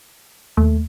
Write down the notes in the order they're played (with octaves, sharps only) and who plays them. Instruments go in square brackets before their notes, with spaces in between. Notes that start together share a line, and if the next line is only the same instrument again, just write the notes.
[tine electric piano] D#2 [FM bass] A3